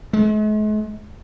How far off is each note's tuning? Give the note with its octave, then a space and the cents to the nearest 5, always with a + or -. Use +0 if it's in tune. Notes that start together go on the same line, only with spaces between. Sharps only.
G#3 +45